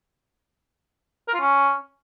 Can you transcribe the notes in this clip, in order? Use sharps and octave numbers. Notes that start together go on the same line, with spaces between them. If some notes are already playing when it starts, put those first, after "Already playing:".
A#4
F4
C#4